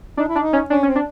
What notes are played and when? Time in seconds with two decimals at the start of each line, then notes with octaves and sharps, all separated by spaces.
0.17 D4 D#4
0.28 E4
0.35 D4
0.40 D#4
0.53 C#4
0.70 C#4 D4
0.83 C#4
0.87 C4
0.96 D4